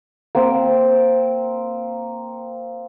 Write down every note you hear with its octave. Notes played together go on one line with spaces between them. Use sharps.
A#3 C4